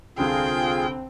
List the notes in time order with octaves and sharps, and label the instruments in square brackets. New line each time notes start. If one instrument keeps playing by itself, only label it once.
[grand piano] C2 D3 [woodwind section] C4 [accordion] F4 G#4 [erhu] G5